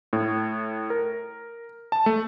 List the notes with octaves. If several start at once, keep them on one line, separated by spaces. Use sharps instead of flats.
A2
A#4
A5
A3